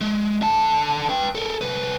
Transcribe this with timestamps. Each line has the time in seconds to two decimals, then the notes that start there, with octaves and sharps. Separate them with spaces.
0.01 G#3
0.42 D3 A5
1.09 B4 G5
1.35 A4 A#4
1.61 C2 B4